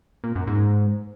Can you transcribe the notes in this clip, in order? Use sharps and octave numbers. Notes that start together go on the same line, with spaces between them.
A#2
F#2
G#2